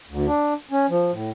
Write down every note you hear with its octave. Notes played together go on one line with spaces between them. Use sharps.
D2
D4
C#4
F3
A2